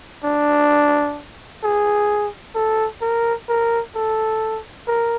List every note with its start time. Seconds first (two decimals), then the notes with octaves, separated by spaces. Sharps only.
0.24 D4
1.64 G#4
2.55 A4
3.01 A#4
3.49 A#4
3.95 A4
4.88 A#4